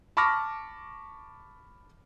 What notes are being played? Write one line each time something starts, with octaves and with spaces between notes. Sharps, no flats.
A5 B5 C#6 D6 F6 A#6